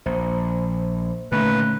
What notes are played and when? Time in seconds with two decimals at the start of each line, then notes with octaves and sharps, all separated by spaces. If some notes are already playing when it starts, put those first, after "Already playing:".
0.06 A#1 C5
1.32 A#2 D3 D#3 A3 C#4 B4